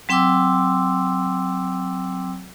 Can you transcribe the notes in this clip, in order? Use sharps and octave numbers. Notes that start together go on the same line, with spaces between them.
F#3 C4 G5 C6 D6 E6